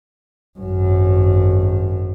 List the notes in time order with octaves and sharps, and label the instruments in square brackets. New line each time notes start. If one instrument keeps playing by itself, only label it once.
[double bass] G#1 F#2